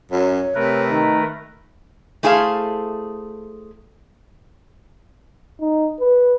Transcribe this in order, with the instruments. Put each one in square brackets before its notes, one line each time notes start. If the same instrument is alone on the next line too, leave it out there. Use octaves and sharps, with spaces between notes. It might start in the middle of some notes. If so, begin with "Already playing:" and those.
[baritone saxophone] F#2 [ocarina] C#5
[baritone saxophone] C3 [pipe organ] A3 A#4 B4
[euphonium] D#3
[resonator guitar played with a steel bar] A3 E4 G#4 A4 C5 F5
[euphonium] D#4
B4